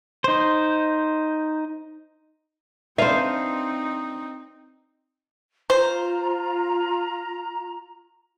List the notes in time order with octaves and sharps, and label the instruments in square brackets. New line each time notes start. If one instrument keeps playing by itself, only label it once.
[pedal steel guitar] D#4 C5
[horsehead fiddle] C4 D#4 [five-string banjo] D4 B4 E5 [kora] C5 F5
[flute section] F4 A#5 [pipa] C5